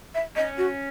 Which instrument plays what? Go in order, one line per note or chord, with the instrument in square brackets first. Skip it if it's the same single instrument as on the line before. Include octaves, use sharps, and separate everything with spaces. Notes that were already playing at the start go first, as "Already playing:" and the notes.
[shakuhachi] E5
[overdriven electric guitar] C#4 [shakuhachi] D#5
[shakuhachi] F#4